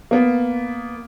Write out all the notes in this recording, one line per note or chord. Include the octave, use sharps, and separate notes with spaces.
A#3 B3